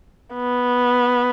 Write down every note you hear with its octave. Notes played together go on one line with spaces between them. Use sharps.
B3